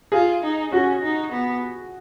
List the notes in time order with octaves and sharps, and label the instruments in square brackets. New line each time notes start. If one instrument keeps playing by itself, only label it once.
[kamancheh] F4 [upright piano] G#4
[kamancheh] D#4
[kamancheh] C#4 [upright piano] F#4
[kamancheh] D#4
B3